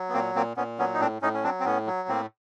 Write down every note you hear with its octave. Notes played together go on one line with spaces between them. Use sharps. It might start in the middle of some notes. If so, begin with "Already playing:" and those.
Already playing: F#3
B3
A#2 A#3 C4
A#2 A#3 C4
A#2 B3 C#4
F#3 B3 C#4
D#4
A2 C4 D4
A2 C#4 D#4
C#4
F#3 C4 D4
C4
A2 B3 C#4
F#3
A2 A#3 C4